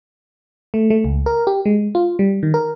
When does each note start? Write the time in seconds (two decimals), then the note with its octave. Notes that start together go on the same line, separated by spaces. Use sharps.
0.74 A3
0.90 A3
1.05 C#2
1.26 A#4
1.47 G4
1.66 G#3
1.95 F4
2.19 G3
2.43 D#3
2.54 A#4